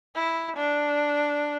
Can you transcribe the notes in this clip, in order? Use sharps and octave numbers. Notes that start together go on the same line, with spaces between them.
E4
D4